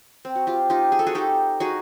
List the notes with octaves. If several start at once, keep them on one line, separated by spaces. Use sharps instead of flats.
C4
F#4
F4 G4
D#4 F4 G4
G#4
A4
F#4 G#4
D#4 G4 A4
D#4 F#4 G#4